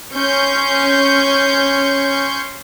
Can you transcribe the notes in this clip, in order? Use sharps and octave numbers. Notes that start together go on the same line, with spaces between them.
C#4 C6 C#6 G6